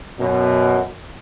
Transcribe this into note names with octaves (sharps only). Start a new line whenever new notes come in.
F#2 B2